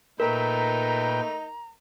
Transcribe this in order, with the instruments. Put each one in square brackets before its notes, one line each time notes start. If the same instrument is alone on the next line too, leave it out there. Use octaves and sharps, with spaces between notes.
[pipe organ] A#2 B4 G5 [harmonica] A3 D#4 [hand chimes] A#4 [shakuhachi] A#5